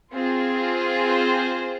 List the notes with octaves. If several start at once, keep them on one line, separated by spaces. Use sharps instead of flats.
C4 F4 G#4
C5